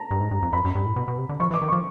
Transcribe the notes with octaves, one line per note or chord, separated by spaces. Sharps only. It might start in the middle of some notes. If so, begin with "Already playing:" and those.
Already playing: A5 A#5
G2
G#2
G2
F2
F2 B5
F#2
G2
A2
B2
B2
C3
D3
F3 C#6
E3
D6
D#3
F3 C#6